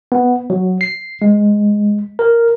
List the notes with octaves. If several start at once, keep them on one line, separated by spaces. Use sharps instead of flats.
B3
F#3
C7
G#3
A#4